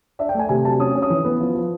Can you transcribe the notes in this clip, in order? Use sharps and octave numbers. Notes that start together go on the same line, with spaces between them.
D4 E5
G5
A3 G#5
C3 G#5
F#3 A5
C#4 D#6
C#4
D#6
E3
B3
F3
F3